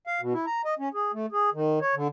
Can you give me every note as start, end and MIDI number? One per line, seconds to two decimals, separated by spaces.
0.07 0.21 77
0.21 0.33 47
0.34 0.45 64
0.46 0.61 82
0.65 0.74 75
0.79 0.89 61
0.94 1.12 68
1.14 1.26 57
1.32 1.50 68
1.53 1.79 51
1.81 1.95 73
1.95 2.08 50